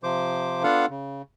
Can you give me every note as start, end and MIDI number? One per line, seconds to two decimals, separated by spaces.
0.03 0.63 48
0.03 0.63 53
0.03 0.63 72
0.03 0.63 86
0.63 0.86 59
0.63 0.86 62
0.63 0.86 65
0.63 0.86 69
0.63 0.86 77
0.63 0.86 78
0.90 1.22 49